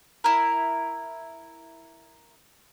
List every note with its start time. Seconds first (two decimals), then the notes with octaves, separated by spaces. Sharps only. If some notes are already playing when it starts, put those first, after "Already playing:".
0.24 E4 A#4